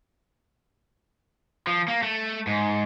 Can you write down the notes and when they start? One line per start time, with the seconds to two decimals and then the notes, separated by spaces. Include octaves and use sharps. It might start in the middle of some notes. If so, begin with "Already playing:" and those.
1.67 F3
1.88 A#3
2.03 A3
2.47 G#2